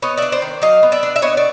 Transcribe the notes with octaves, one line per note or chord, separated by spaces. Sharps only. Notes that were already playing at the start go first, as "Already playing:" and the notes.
B3 C#5 D#5
D4 D5 E5
C5 D5
D#3
F#3 D#5 F5
B3
D5 E5
D4
E5
B3 C#5 D#5
D5